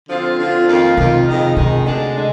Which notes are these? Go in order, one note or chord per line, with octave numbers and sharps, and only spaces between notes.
D3 F3 C4 F4
D3 F3 C4 F4
F2 D#3 A#3 F4
F2 C3 D#3 A#3 F4
F2 D#3 G#3 D#4
F2 C3 D#3 G#3 D#4
D2 D3 G#3 D4
D3 G#3